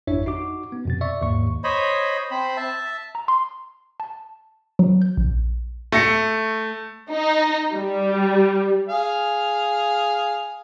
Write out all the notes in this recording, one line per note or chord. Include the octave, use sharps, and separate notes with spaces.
G#1 F2 D4 E4 C#5 E5
D#4 F#4 D6
B3
F2 B2 A6
D5 E5 C#6
D#2 G#2 C#6
C5 C#5 D#5 B5
C4 C5 B5
E5 A5
A#5
C6
A5
F#3
G6
A#1
A3 A#6 C#7
D#4
G3
G#4 F5